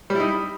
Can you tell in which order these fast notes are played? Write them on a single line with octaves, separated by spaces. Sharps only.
G3 E4 D#4